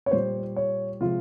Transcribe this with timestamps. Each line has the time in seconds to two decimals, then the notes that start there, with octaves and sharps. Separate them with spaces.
0.06 C#5
0.11 A#2 G3 C5
0.56 C#5
1.01 C3 F3 G#3 F4